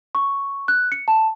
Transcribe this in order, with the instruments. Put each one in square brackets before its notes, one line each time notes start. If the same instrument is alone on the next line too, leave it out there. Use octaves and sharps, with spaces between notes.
[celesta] C#6
F#6
C#7
A5